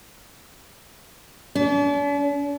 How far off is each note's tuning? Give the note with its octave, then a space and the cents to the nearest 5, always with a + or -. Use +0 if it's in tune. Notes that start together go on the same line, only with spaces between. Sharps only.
D4 -45